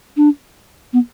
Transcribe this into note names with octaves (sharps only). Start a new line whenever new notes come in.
D4
B3